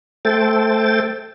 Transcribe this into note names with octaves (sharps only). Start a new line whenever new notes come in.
A3 A4 C5 G5 A6